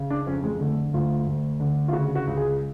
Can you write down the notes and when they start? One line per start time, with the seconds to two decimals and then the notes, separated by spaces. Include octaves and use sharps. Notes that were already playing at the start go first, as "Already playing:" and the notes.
Already playing: C#3
0.10 D4
0.27 F2 C#4
0.44 G#3
0.60 D3 A3
0.93 D2 F4
1.27 D2
1.60 D3
1.88 F4
1.93 C#3 F#4
2.15 F#4
2.27 C#2
2.37 G#4